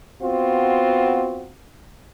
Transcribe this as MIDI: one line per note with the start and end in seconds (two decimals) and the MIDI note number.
0.22 1.52 59
0.22 1.52 60
0.22 1.52 65
0.22 1.52 66